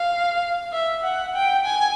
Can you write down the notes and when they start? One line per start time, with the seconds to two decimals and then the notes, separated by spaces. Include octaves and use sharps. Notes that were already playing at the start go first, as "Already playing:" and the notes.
Already playing: F5
0.73 E5
1.04 F#5
1.35 G5
1.66 G#5